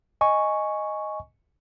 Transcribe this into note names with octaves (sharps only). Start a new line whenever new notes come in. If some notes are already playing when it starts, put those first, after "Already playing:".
D#5 G#5 C#6